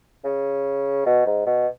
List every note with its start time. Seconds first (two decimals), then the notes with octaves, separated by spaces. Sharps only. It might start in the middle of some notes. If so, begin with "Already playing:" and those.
0.25 C#3
1.06 B2
1.26 G#2
1.46 B2